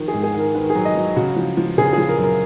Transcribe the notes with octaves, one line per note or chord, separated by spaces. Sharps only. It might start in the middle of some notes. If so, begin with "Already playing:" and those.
Already playing: D#3 F3
G#4
G#2
G#4
D#3 A#4
D#3 B4
G#4
F#3
D#5
F#3
C#3 F#4
F3
F3
C#3 G#4
G#4
F3
A#4
F#2
A#4